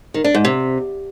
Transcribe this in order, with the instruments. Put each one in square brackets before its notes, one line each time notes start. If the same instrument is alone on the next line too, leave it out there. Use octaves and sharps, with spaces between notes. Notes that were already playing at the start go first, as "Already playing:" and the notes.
[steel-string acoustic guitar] D#3
D4
G#2
C3